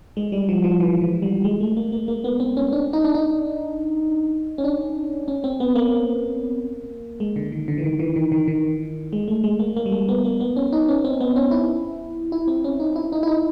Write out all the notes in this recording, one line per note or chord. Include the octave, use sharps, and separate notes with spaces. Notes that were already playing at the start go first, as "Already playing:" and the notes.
G#3
G3
F3
F3
E3
E3
G3
G#3
A3
A#3
A#3
A#3
B3
C4
C#4
D4
D#4
D4
D#4
C#4
D4
C#4
C4
B3
A#3
G#3
D3
D#3
D3
E3
D#3
E3
D#3
D#3
D#3
G#3
A3
G#3
A#3
A#3
G3
G#3
B3
A#3
B3
C#4
D#4
C#4
C4
B3
C#4
E4
E4
C4
C#4
D#4
E4
D#4
E4
D#4